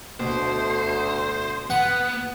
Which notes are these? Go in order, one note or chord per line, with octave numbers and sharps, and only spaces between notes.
D2 B2 C5
B3 F#5